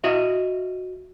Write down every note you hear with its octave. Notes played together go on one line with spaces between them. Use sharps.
F#4 D#5 E5